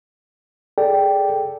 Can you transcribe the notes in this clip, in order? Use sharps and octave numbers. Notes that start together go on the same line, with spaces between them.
G#4 A4 D5 G5